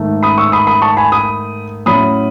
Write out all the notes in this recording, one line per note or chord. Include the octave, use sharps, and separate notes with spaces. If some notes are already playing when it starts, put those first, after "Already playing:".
Already playing: G#2 D#3 A3
B5 D#6
C#6 E6
B5 D#6
B5 D#6
A5 C#6
G#5 B5
B5 D#6
A2 F#3 C#4 E4 B5 D#6